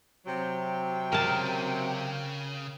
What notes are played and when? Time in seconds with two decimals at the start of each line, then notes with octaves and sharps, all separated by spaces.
0.26 C3 F#3 G5
1.12 C#3 A#4 A5